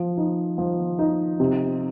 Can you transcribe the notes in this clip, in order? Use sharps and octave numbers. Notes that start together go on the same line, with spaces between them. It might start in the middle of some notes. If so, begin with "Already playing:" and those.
Already playing: F3
D#4
F3
D#4
C3